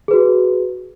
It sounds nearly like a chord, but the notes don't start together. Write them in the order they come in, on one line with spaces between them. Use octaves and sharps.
G#4 B4 F#4